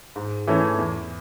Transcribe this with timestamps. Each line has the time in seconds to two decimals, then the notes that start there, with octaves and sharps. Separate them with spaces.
0.16 G#2
0.47 E3 A3 C#4
0.78 E2